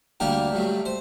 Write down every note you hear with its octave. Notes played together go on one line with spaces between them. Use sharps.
D2 D3 G3 A#3 G4 A#4
G2 F#3 A3
C5